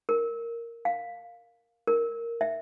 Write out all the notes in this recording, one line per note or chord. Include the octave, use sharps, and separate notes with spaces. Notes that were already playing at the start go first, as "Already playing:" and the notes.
A#4
F5
A#4
E5